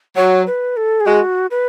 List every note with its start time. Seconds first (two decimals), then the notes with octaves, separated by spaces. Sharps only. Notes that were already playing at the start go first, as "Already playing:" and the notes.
0.16 F#3 C#5
0.47 B4
0.77 A4
1.00 G#4
1.06 G#3 F#4
1.51 B4